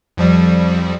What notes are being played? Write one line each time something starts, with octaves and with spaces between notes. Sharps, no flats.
F2 F3 G3